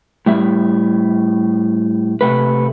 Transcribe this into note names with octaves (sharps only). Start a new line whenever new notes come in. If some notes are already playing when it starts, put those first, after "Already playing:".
A2 G3 E5
C3 A3 B4